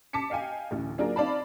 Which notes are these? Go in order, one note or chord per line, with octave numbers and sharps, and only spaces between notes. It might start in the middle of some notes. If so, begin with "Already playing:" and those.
A5 D6 B6 C#7
D#5 F5 G5 G#5
A1 D2 A2
F#3 A#3 D4 F4 G#4 A#4
C4 D#4 D5 F5 A5 B5